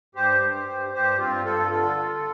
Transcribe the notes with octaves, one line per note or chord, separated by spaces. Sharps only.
G2 G4 C5
G2
G2
G2 G4 C5
G2 C4 F4
G2 F4 A4
D3 F4 A4
D3